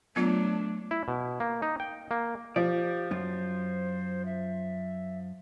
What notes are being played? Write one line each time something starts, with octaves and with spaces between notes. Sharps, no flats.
F#3 A3 B3 D4 F4
E4
B2
A#3
D#4
G5
A#3
F3 G4 D5
F#2 F4 C5
E5